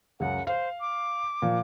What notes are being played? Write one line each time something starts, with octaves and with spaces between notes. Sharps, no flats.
C#2 F#2 F#5
C5 F5
D6
A#2 F3